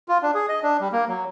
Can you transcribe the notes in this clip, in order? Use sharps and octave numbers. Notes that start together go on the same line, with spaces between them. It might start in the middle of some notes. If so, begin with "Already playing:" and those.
F4
D4
G#4
D#5
D4
G3
A#3
F#3